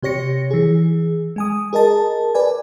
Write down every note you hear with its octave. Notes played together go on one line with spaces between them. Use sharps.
C3 G4 C#5 A#6 C#7
E3 G#4
G#3 G#5 D#6
G#4 A#4 D#5 A5
B4 D5 G#5